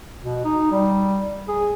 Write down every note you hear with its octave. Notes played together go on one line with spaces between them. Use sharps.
B2
D#4
G3
G#4